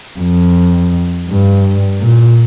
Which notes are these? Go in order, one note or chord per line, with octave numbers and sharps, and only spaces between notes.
F2
G2
A#2